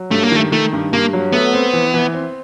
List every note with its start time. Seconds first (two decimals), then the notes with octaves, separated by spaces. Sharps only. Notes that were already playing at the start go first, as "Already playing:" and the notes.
Already playing: F#3
0.11 G2 A3
0.23 A#3
0.32 D#3 A3
0.52 D#3 A3
0.73 G2
0.93 G2 A#3
1.13 F#3
1.33 A3 B3
1.53 C4
1.73 E3
1.94 E3
2.14 C4